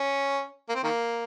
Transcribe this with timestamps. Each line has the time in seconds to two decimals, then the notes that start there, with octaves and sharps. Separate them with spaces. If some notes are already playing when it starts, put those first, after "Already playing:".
Already playing: C#4
0.69 A#3
0.75 C4
0.83 D#3 A#3